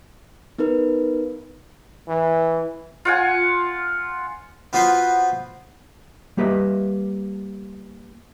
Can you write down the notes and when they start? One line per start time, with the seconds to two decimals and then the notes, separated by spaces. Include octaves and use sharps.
0.58 B3 D#4 A#4 B4
2.08 E3
3.05 F4 F#5 G#5
4.73 B3 F4 F#4 B4 C5
6.37 G3 A#3 G4 B4 D#5 E5